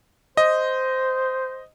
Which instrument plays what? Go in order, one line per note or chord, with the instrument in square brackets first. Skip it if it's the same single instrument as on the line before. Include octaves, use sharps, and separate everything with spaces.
[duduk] C5 [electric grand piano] D#5